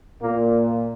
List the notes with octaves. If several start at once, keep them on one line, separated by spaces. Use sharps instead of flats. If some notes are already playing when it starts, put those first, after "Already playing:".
A#2 A#3